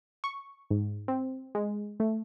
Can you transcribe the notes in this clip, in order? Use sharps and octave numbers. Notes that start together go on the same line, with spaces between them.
C#6
G#2
C4
G#3
A3